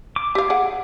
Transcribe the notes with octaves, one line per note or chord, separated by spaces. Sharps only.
D6
G4 F5
G#4 F#5